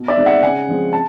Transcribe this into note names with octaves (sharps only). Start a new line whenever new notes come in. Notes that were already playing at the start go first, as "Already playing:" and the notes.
Already playing: B2
D5 E5
G#3 C4 D#4
E5 F#5
C#3 F#5 G#5
F3 G#3 C4
A5